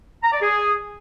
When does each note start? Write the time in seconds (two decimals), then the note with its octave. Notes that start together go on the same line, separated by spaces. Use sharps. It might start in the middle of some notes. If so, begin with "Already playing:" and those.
0.23 A#5
0.32 D5
0.41 G#4